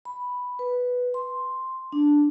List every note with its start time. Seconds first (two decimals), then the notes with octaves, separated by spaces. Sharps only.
0.05 B5
0.59 B4
1.14 C6
1.92 D4